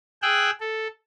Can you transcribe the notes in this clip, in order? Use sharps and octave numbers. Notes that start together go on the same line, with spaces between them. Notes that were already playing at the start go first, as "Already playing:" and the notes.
G#4 G5 E6 F#6
A4